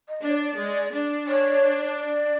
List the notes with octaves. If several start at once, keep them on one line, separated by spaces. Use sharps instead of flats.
D#5
D4
C#5
D5
G#3
D4
C#5
D5